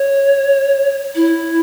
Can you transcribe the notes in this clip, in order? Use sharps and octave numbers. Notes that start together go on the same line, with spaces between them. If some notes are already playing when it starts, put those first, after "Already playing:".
Already playing: C#5
E4